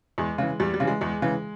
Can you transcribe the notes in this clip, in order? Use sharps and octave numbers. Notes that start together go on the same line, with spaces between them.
E2 G#3
C#3 E3
E2 G3
G3
C#3 E3
G#3
E2 G#3
C#3 E3